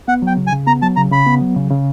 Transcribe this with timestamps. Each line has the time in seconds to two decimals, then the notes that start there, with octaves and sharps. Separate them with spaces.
0.08 B3 F#5
0.22 F#3
0.27 G5
0.37 C#3
0.47 G#5
0.52 C#3
0.67 B3 A#5
0.82 F#3 A5
0.96 C#3 A#5
1.11 C#3 B5
1.27 B3
1.41 F#3
1.56 C#3
1.71 C#3